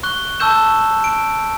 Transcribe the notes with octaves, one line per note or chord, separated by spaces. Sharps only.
C#6 F#6 G7
A5 C#6 E6 G6 E7
D7